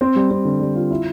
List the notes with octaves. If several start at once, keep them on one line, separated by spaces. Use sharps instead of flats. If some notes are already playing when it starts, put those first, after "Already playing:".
C4
G3
C4
D3
G3
F4
E4